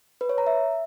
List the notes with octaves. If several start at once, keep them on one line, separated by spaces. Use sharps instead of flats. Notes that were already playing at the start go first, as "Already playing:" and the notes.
B4
C#5
A#5
E5